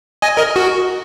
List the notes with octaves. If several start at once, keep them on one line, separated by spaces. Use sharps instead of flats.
D#5 G#5
A#4 D#5
F#4